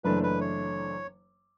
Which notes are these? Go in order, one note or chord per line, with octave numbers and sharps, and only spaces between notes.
F#1 F#2 E3 A3 D4 B4
B4
C#5